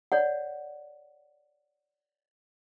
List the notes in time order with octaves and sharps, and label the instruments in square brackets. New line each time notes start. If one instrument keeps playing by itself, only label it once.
[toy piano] C#5 D5 F#5